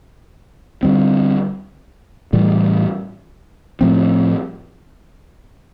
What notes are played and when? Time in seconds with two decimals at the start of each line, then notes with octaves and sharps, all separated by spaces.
0.83 D3 G3 C4
2.33 A2 E3 G3
3.81 A2 F3 A3 C4